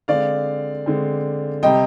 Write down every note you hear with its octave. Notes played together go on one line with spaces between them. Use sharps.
D3 G#3 C4 D5 F5
D3 G#3 C4
C3 G3 C4 D#5 G5